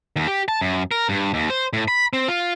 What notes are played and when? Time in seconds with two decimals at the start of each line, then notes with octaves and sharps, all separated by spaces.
0.16 D#2
0.28 G4
0.48 A5
0.61 F#2
0.91 A#4
1.09 G2
1.34 D#2
1.50 C5
1.73 A2
1.88 B5
2.13 C4
2.28 F4